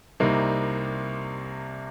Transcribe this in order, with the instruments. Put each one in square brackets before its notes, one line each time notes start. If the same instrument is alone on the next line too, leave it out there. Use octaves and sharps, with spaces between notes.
[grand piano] C2 C3 G3 A#3 D#4